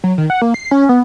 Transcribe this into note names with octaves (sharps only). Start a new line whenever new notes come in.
F#3
D#3
F#5
A#3
C7
C#4
B3